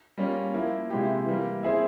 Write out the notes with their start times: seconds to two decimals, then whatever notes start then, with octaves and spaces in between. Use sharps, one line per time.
0.18 G3 A#3 C#4 F4
0.54 F3 A#3 E4
0.90 C3 F3 G#3 E4 G4
1.26 E3 G3 A#3
1.63 C4 E4 G#4 E5